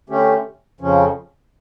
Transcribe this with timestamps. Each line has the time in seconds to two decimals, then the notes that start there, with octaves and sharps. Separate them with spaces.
0.09 D3 A3 C#4 G4
0.81 F2 C#3 F3 C#4